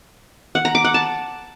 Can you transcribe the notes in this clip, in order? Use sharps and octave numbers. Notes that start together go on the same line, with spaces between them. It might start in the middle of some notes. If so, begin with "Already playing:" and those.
F#5
A#5
D6
F#5
A5